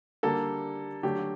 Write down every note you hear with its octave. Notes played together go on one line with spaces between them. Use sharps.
D3 G3 A#3 A4
D3 F#3 A3 G4